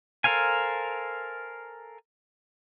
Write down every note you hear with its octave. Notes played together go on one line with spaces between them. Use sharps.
A4 A#4 C5 F5 G#5